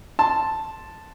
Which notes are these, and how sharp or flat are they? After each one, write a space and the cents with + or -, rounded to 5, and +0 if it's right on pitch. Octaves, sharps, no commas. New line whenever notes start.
A5 +0 C6 +0